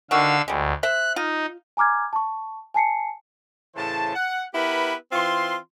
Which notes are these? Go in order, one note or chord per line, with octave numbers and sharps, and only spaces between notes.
D3 D#3 F#4 F5 E6
D2 G3 G#3
C5 E5 F#6
D#4 F4
G#5 A#5 D6 F6 G#6
A5 C#6
G#5 A5 C7 C#7
A2 C#3 E3 C5 A5
F#5
B3 E4 G4 A#4 B4 B5
E3 C4 F4 C6